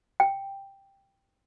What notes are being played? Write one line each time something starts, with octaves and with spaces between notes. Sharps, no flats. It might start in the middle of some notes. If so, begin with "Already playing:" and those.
G5